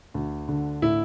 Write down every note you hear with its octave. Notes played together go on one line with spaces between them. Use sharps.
D2
D3
A2 E4